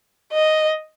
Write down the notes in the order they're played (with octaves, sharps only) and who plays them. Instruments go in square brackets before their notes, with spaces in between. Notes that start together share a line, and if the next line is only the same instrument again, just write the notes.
[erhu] D#5